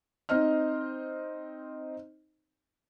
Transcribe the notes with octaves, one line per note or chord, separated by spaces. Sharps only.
C4 D#4 C5 D#5 F6